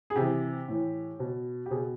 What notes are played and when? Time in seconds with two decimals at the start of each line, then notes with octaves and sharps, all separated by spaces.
0.10 G#4
0.16 C3 E3 G4
0.68 A2 E3
1.20 B2
1.66 G4
1.71 B2 G#4